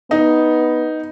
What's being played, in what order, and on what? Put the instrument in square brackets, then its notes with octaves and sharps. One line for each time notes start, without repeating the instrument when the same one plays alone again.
[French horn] B3 [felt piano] D#4